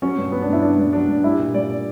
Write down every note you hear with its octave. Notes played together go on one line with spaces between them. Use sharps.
F#3 C#4
G2
F#3 B3
D4
G2 E4
F#3 D4
G2
F#3 D4
G2
G3 E4
A#2
G3 D5
A#2